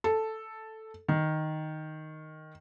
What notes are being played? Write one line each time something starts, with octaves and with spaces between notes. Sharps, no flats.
A4
D#3